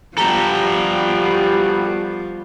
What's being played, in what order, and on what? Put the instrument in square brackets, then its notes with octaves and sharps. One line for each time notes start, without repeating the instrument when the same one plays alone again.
[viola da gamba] F3 [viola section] G3 B3 F#4 [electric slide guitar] G4 A4 [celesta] A#5